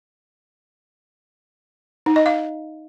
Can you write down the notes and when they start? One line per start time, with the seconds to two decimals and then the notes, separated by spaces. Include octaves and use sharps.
2.06 D#4
2.16 D#5
2.26 F5